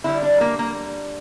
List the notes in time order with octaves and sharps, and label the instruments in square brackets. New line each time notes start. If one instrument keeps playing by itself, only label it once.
[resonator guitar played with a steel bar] D3 G3 E4
D4
A#3
A#3